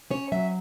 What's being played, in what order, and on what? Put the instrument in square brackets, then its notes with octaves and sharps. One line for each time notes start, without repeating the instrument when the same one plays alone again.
[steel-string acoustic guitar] C#4 C#5
F#3 E5